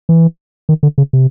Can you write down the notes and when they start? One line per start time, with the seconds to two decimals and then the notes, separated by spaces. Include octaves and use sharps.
0.09 E3
0.69 D#3
0.83 D3
0.98 C#3
1.13 C3